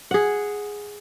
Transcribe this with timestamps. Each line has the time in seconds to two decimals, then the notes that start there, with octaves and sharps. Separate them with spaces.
0.11 G#4 F#5